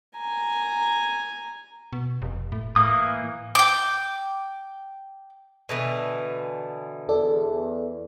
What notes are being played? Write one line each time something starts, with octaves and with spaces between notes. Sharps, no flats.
G#5 A#5
B2
F1
A2
A2 E3 A#3 D#6
G5 D6
B2 D3 E3
E2 A4 D5